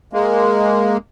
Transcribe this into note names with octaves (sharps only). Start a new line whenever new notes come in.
G#3 A#3